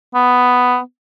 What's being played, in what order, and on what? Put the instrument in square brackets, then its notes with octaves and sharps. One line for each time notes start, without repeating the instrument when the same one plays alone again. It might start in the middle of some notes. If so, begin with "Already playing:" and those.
[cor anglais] B3